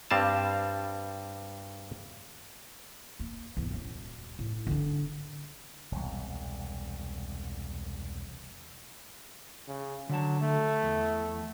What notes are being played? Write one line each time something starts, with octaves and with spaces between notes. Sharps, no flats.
G2 G3 C4 F5 A5
A#3
A1 E2
D#1 F#2
A2
D3 D4
E1 C2
C#3
D3 F#3 A5
A3
E2